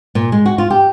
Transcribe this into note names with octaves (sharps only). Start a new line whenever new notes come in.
A#2
G#3
F#4
F4
G4